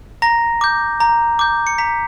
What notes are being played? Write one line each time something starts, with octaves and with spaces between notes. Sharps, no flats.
A#5 A#6
D6 G6
A#5
D6 G6
C#7
A#5 B6